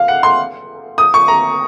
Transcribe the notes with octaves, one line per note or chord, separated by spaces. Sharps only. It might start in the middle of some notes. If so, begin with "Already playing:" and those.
Already playing: F5
F#5
C6
D#6
C#6
A#5